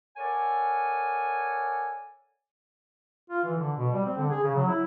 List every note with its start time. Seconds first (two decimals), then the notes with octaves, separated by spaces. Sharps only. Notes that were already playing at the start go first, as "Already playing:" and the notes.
0.17 A4 A#4 C#5 D5 F#5 G#5
3.30 F4
3.44 E3
3.58 D3
3.76 B2
3.92 G3
4.05 C4
4.17 D3
4.31 G#4
4.43 C#3
4.55 F#3
4.68 E4